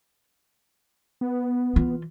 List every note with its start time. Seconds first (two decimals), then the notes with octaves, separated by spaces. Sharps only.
1.21 B3
1.76 E3 F4